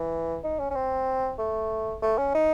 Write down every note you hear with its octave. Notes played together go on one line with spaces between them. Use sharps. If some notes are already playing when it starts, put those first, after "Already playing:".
Already playing: E3
D#4
C#4
C#4
C4
A3
A3
C#4
D#4